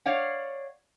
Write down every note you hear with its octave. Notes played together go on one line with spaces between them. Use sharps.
C#5 D5 F5 F#5